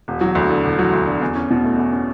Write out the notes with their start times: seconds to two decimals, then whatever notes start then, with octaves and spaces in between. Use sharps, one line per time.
0.08 E1
0.21 F#3
0.35 D2
0.50 D3
0.64 E1
0.79 F#3
0.93 D2
1.07 D3
1.22 E2
1.35 C#4
1.51 B2
1.64 A3
1.78 E2
1.92 C#4